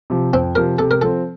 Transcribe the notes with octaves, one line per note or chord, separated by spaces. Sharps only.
C3 F3
F2 C4
C3 F3 A#4
C3 A4
A#4
F3 C4 A4